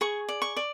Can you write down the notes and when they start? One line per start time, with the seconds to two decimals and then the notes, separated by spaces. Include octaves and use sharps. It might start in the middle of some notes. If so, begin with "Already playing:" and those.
0.01 G#4 C#6
0.29 D5
0.42 C#6
0.57 D5